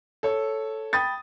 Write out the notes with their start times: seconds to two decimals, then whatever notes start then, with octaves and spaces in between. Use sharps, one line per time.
0.23 A4 C#5
0.93 G5 B5 D#6 A6